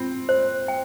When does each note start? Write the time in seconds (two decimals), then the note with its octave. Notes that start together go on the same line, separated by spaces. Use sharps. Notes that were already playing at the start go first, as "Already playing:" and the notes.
Already playing: C4 F4
0.29 C5
0.68 G5